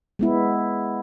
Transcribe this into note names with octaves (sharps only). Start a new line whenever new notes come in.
G#3 B3 E4